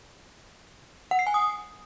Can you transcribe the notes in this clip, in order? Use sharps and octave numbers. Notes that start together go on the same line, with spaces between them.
F#5
C7
G#5
D#6